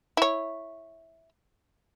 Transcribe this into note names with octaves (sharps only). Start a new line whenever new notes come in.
E4 C#5